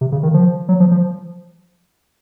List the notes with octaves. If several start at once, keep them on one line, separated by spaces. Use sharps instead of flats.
C3
C#3
D#3
F3
F#3
F3
F3